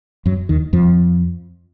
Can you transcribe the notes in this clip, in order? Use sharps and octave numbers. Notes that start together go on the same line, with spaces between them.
F#2 F#3
D#2 D#3
F2 F3